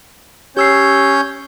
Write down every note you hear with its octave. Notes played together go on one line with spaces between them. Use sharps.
C#4 G4 C#5 E6 G6 C7